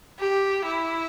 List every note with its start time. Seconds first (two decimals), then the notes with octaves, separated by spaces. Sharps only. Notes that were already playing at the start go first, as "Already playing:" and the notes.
0.19 G4
0.65 E4